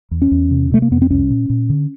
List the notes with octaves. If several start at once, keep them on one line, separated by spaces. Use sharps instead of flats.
E2
C#4
E2
C3
C3 A3
A#3
F2 B3
C4
C2 C#4
A#2
A#2
D3